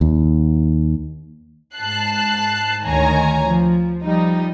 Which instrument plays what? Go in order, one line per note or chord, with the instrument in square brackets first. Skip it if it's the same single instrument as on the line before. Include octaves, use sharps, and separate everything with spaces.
[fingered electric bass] D#2
[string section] G#2 A5 F#6 C7
D2 D#3 C#5 G#5 A#5
F3
F3 G3 D#4